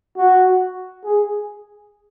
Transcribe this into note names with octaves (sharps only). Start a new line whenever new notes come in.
F#4
G#4